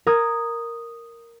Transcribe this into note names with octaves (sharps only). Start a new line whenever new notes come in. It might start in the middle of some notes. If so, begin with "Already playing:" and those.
A#4 D#6 G#6